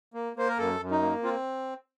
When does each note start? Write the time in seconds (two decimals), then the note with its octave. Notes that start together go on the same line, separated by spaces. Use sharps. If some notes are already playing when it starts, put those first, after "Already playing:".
0.14 A#3
0.36 A#3 C5
0.48 A#4
0.58 F#2 A4
0.80 F#2
0.91 D#4
1.02 A#3
1.23 C4 F4